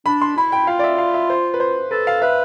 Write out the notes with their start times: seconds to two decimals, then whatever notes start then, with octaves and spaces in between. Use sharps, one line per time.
0.06 D4 B5
0.21 C6
0.37 E4 B5
0.52 G5
0.67 F4 F5
0.79 D5
0.84 E5
0.98 F5
1.14 E5
1.30 C5
1.54 B4
1.60 C5
1.91 A4 B4
2.07 F5
2.22 B4 E5